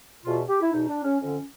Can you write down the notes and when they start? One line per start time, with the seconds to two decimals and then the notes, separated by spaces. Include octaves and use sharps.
0.24 E2 B2 F4
0.48 G4
0.61 E4
0.72 E2 B2 D#4
0.88 D4
1.04 C#4
1.20 F2 D3 C#4